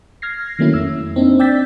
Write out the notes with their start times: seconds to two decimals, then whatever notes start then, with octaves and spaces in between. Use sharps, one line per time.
0.22 F6 G#6 A#6 C7
0.59 D#3 F#3 A3 A#3 C#4 E4
0.74 F2 E6
1.16 A#3 C4 D4 D#4
1.39 D5 G5 E6 G6 A6 B6